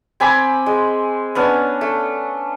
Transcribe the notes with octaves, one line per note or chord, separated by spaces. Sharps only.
C4 G#5 B5 D6
G#3
B3 C#4 D4
A3